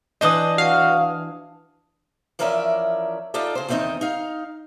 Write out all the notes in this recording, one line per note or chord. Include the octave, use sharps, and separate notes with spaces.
E3 D4 C5 D#5 D#6
F#4 F5
E3 F3 C#4 A#4 D5 E5
D#4 F4 A4 D5 E5
C#3 C5
E2 D#3 G3 C4 D#4 D#5
D#4 F5